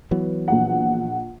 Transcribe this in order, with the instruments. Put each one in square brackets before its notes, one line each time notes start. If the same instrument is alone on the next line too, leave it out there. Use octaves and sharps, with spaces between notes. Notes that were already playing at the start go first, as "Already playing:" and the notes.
[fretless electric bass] E3 F#3 B3
[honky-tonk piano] A#1 F#5